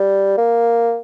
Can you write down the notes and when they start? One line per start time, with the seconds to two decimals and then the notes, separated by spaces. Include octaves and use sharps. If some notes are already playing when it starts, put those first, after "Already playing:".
Already playing: G3
0.37 A#3